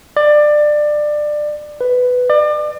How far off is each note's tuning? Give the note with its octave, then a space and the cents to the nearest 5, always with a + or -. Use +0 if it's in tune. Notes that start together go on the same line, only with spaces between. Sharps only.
D5 +20
B4 +10
D5 +35